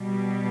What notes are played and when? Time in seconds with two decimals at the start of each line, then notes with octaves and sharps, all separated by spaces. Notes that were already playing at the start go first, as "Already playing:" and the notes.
Already playing: B2 G3